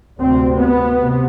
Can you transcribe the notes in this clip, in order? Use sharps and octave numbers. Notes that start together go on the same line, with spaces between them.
D2 C3 C4
B3
C3